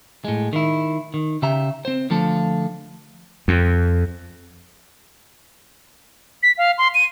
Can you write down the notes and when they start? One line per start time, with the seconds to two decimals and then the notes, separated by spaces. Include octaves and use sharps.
0.25 A2 G#3
0.53 D#3 E4
1.14 D#3
1.42 C#3 G4 E5 A#5
1.85 C4 C5
2.10 D3 F3 A3 F4 A4
3.48 F2
6.43 B6
6.58 F5
6.78 C6
6.95 D#7